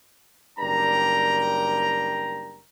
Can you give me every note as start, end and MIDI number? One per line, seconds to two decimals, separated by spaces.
0.59 2.61 30
0.59 2.61 55
0.59 2.61 62
0.59 2.61 70
0.59 2.61 79
0.59 2.61 82